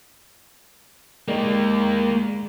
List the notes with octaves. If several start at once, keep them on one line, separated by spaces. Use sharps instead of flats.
G#3 A#3 D#4 G#4 D5